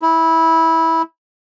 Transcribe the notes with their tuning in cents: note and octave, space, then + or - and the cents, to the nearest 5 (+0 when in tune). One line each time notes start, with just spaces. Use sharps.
E4 -15